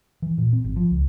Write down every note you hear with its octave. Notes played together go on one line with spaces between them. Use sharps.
E3
A#2
C4
G#1
F3
C#2